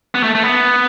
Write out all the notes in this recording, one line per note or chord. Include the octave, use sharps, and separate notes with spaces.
B3
A3
A3
B3